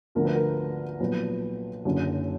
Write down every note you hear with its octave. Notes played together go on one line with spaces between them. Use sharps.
D2 D3 F3 A#4
B4
A#4
B1 A#2 F3 B4
F#1 F#2 D3